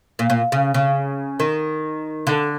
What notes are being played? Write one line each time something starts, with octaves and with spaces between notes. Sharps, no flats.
A#2
A#2
C#3
C#3
D#3
D3